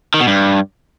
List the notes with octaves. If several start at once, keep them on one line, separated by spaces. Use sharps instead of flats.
D#3
B2
G2